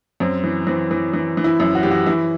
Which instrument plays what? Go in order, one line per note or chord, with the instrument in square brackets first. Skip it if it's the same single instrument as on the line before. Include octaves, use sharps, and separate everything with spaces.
[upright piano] F#2 C4
E3
E3 C4
E3
E3
E3
E4
F#2
F#4
E3 G4
F#4
E3 E4